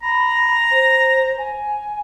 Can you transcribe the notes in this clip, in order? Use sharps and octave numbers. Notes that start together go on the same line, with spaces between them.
A#5 B5
C5
G#5